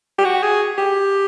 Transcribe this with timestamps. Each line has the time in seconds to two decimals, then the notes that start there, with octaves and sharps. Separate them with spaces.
0.18 G4
0.25 F#4
0.43 G#4
0.78 G4